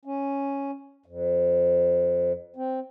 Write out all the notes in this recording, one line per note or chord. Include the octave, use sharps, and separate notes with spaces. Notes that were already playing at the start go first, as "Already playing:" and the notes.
C#4
F2
C4